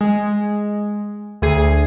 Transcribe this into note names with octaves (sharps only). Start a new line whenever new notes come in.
G#3
D2 G#4 C7